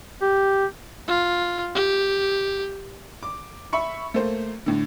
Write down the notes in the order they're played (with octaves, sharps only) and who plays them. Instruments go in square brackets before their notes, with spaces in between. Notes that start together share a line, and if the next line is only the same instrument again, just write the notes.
[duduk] G4
[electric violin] F4
G4
[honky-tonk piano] D6
E5 B5 C#6 C#7
A3 A#3 C5
A2 D3